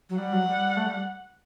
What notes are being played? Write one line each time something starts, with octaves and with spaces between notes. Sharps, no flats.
F#3
G3 F#5
F#3
G3
A3
G3